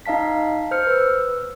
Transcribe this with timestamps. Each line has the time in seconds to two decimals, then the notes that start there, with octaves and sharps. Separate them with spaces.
0.06 D#4 D#5 F5 A5 B6
0.71 C5 F6 C#7
0.87 B4 E6